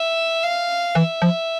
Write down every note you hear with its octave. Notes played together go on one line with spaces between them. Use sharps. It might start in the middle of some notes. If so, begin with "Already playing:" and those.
Already playing: E5
F5
E3 E5
F3